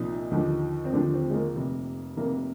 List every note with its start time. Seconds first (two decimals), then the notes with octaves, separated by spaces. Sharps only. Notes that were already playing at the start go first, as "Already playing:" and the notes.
Already playing: C2 A#2 F3 D#4
0.31 D#2 D3 F3
0.85 C4
0.93 D#2 D3 F3 D4
1.14 C4
1.30 G#3
1.34 A#3
1.55 F1 F2 C3
2.17 F1 F2 C3 A#3